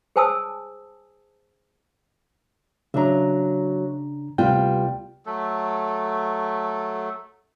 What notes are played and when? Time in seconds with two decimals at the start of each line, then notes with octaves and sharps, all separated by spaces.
0.16 G#4 C5 G#5 A5 D#6 E6
2.94 C#3 F#3 D4 E5 A#5
4.38 D2 C3 G3 B3 F4 G5
5.26 F#3 A3 A4